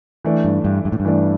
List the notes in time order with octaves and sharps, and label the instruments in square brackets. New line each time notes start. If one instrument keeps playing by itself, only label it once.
[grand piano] E3 A3 D4
[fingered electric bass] G2
G2
G2
A2
G2
[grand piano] E3 A3 D4